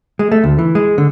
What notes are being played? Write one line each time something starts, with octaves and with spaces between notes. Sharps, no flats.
G#3
A3
D2
E3
G#3
D3